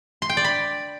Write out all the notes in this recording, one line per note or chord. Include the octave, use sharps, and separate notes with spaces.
C6
G5
D5
B5